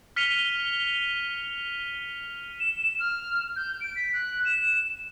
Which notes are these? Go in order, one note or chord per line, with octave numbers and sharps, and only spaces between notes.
F6 B6 C#7 D#7 F7 G7
E7
F6
G6
D7
B6
F#6
E7